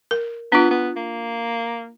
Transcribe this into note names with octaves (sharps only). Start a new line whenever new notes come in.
A#4
B3 D4 F4
B3
A#3